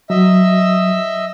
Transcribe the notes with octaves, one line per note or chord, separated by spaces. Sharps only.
F#3 D#5 E5 E6